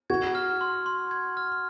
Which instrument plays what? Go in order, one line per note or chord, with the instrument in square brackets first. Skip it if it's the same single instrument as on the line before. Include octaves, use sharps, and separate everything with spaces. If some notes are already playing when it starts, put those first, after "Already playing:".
[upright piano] F#4 [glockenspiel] G#6
[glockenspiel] F6
C6
C6
G#6
F6